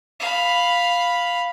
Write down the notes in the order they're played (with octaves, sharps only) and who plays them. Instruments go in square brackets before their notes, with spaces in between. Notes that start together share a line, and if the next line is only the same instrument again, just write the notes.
[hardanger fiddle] F5 B5